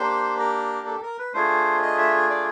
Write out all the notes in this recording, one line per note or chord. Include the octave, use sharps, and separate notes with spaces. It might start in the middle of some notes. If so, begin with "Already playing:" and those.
Already playing: A#3 D4 G4 C5
A#4
A4
A#4
B4
A3 D4 F4 G#4 C5
D#5
E5
D5